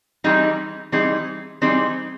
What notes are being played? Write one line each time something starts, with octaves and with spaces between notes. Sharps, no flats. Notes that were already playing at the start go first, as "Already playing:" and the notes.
E3 G3 C4 D#4 G#4
E3 G3 C4 D#4 G#4
E3 G3 C4 D#4 G#4